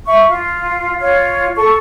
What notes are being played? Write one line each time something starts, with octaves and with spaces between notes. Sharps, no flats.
E5 C#6
F4
F4 C#5
A4 C#6